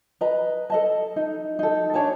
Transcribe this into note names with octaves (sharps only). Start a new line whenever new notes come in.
B4 D#5 A#5
A4 D#5 A5
D#4
D#4 A4
D4 C#5 G#5 A5